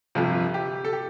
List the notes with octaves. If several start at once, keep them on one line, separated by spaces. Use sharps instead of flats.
G1 F2 C3 F4
G4
A4
G4